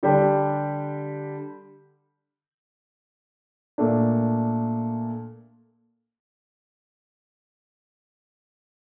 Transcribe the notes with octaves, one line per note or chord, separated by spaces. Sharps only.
D3 G3 D4 G4
A#2 A3 D4